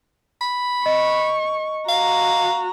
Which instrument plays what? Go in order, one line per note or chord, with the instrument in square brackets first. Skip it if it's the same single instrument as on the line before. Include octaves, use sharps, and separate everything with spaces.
[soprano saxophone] B5
[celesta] D#5 [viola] C#6
[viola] F#4 A#5 [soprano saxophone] F5